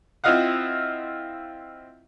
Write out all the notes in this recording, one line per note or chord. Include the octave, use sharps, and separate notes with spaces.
C4 E4 F4 D#5 F5 F#5